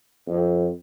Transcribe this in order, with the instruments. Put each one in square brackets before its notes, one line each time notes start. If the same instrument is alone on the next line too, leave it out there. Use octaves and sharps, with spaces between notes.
[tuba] F2